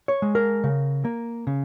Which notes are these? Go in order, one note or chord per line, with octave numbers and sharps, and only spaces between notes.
C#5
G#3
A#4
C#3
A#3
C#3